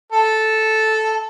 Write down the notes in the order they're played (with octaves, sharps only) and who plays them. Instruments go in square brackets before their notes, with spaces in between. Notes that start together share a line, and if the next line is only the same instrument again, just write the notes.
[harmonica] A4